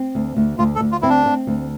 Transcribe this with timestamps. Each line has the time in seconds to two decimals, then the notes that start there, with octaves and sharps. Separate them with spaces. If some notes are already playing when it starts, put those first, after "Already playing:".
Already playing: C4
0.15 D2
0.37 D2
0.59 D2 F4
0.76 A4
0.81 D2
0.92 F4
1.02 C4 E4
1.09 D4
1.26 C4
1.47 D2